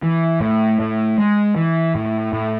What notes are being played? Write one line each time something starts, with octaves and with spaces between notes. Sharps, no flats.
E3
A2
A2
G#3
E3
A2
A2